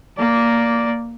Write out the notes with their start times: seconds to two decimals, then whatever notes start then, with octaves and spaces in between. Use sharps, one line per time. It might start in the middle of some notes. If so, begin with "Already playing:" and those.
0.18 A#3 D5